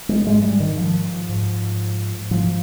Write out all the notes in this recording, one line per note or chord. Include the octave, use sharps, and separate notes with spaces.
G#3
G#2 G#3
G3
D#3
F3
G#2
G#2 F3